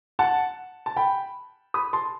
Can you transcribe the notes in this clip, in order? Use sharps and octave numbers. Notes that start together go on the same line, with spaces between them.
F#5 A5
A5
G5 B5
B5 D#6
A5 C6